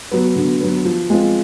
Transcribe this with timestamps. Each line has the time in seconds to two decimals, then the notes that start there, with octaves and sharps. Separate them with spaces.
0.11 F#3 B3
0.36 D3
0.61 F#3 B3
0.85 F3
1.10 G#3 C4 F4